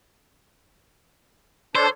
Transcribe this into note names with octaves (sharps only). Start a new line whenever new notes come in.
D4 A4 C5 C#5